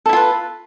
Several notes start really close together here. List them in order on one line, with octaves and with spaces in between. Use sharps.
A4 E4 F4 B4